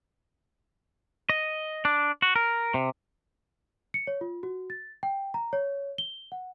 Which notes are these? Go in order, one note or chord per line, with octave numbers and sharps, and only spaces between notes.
D#5
D4
F#4
A#4
C3
C#7
C#5
F4
F#4
A6
G5
A#5
C#5
G7
F#5